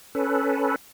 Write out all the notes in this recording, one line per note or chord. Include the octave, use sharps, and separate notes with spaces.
C#4 A4 B4